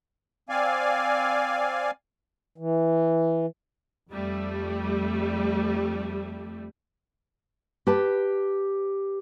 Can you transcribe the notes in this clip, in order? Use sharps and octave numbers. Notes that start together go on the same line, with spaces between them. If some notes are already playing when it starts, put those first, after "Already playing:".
C4 D5 F5 G#5
E3
F2 G3 A3
G4 B4 A5